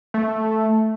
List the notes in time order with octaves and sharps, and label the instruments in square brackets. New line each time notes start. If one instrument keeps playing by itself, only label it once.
[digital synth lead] A3